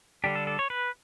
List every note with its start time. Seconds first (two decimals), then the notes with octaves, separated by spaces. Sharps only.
0.24 D3 G3 D4 G4
0.35 A4
0.47 A4
0.59 C#5
0.70 B4